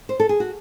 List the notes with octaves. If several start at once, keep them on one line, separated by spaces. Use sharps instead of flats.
C5
A4
G#4
F#4